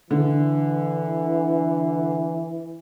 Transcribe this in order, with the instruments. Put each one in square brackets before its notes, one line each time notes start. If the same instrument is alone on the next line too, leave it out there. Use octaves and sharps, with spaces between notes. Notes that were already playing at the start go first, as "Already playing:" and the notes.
[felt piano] D3 [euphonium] E3